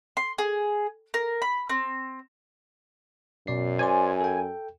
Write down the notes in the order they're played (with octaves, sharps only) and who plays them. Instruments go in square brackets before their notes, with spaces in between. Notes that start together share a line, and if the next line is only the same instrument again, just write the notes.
[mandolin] C6
G#4
A#4
B5
C4
[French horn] F#2 [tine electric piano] B2 D5 C7
[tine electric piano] C5 D5 C6 [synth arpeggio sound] G#5
[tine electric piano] A4 G5